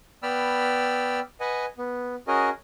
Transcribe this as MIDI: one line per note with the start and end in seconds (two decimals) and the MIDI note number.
0.23 1.20 59
0.23 1.20 74
0.23 1.20 79
0.23 1.20 83
0.23 1.20 88
0.23 1.20 89
1.40 1.66 71
1.40 1.66 75
1.40 1.66 78
1.40 1.66 80
1.78 2.15 59
2.27 2.50 61
2.27 2.50 66
2.27 2.50 68
2.27 2.50 70
2.27 2.50 75